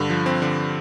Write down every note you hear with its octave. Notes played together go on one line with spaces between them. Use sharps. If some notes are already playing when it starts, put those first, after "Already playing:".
Already playing: G2 D3
F3
C4
D3